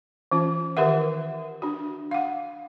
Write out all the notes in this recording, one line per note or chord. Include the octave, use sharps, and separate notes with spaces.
E3 C#4 F4
D#3 G4 A#4 B4 E5 F#5
D4 F#4
F5 F#5